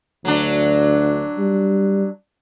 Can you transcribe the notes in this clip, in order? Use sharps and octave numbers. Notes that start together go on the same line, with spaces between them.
D2 F#3 D4
G3